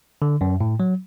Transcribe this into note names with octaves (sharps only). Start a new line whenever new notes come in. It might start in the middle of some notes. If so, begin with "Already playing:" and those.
D3
F#2
A2
F#3